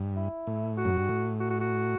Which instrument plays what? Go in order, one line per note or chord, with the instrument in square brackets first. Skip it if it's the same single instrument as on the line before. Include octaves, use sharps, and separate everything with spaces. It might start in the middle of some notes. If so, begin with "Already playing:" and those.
Already playing: [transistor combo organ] G2
[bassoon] E4
[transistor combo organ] A2
[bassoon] F#4
[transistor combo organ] F#2
G2
A2
[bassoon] F#4
F#4
F#4